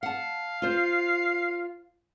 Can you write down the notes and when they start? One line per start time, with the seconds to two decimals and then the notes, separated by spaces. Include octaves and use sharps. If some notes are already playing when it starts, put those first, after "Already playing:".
0.03 F5 F#5 A5
0.62 F4 C5